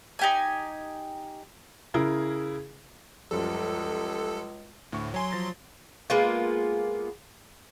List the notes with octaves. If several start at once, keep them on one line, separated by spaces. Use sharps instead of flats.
D#4 G4 G#5
C#3 E4 G#4 A#4
C#2 F#2 F3 G3 A4
D2 A2 C#6
F#3 C#5 G#5 C6
F3 A6 A#6
G#3 A#3 B3 F4